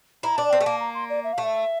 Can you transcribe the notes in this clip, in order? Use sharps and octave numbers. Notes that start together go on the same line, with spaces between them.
E4 A#5
D4 A5
C4 G5
A3
A#3 A5
A#5
C6
D5
E5
A3 F5
E5